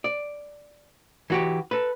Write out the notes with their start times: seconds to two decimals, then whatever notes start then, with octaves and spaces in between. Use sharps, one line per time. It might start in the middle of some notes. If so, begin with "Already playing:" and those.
0.04 D5
1.30 E3 F#4 G4
1.71 A4 B4